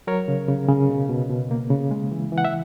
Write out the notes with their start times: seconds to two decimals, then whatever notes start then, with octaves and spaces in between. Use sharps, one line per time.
0.07 F#3 A#4 C#5
0.28 C#3
0.48 C#3
0.69 C#3
0.89 B2
1.09 B2
1.30 B2
1.51 A#3
1.70 C#3
1.91 G#3
2.11 E3
2.32 E3
2.38 F#5
2.45 E5